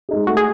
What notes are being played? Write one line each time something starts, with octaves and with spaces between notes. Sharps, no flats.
G#3 D#4 G#4
A3 F#4
G#4